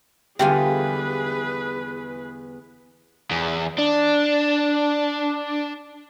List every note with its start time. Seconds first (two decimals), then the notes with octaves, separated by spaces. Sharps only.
0.39 E2 D3 G3 F4 G4 G#4 B4 G#5
3.31 E2
3.78 D4